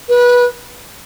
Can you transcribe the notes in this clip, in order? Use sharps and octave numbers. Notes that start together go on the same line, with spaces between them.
B4